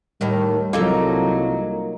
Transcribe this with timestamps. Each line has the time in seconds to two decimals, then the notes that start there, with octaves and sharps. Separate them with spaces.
0.21 D#2 A2 D#3 G3
0.73 C2 F#3 A#3 D#4 F4 A4 A#5